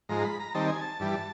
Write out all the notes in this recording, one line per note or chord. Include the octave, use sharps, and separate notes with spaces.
G#2 F3 G#3 A#5
B5
A#5
D#3 G3 C4 D#4 A5
G#5
A5
G2 E3 G3